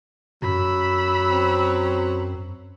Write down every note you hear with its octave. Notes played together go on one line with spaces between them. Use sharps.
F#2 F#3 B5 E6
C4